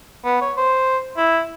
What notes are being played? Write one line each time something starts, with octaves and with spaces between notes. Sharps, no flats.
B3
C#5
C5
E4